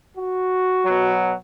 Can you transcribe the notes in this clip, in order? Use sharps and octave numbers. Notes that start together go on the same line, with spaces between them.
F#4
B2 F#3